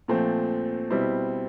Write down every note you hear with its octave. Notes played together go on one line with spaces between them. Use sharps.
A#2 F3 A3 C4
B2 G3 C4 E4